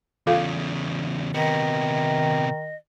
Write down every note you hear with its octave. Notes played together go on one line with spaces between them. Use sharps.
E2 C#3 F4 A4 F5
C3 D#3 B3 D#5